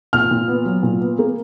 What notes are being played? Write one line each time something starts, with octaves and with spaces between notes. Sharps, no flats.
A#2 F6
A#2
B3
F#3
A#2
B3
A#3